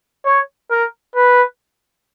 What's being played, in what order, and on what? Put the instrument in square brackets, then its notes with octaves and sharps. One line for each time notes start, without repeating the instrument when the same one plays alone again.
[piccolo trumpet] C#5
A#4
B4